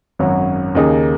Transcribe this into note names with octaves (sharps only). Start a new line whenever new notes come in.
G#1 F#2 F#3 C#4 F#4
D#2 C#3 A#3 D#4 G#4